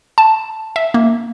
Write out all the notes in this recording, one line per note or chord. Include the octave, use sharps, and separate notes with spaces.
A5
E5
A#3